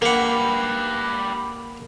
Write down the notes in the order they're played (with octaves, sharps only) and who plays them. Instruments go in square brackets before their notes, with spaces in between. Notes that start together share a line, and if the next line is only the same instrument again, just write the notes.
[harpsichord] A#3 F#5 [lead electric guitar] G4 B4